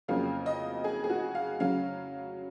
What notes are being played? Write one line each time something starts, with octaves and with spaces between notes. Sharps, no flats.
F2 C#3 F#3 A#3 F5
D#5
G#4
G#4
F#4
F5
C#3 F#3 C#4 F5